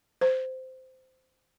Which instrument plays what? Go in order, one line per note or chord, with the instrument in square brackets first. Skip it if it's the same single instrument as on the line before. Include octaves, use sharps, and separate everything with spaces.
[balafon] C5